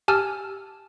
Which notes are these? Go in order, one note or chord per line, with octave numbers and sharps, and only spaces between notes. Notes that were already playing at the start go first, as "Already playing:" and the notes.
G4 G#5 A5 E6 F6